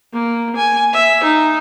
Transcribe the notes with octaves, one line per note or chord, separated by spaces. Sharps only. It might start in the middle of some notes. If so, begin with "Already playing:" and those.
A#3
G#5
E5
D#4